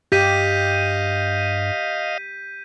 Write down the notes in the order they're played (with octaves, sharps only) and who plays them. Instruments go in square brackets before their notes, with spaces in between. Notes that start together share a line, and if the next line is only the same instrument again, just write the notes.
[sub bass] G2 [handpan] G4 [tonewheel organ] D#5 F5 [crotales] G6 B6 D#7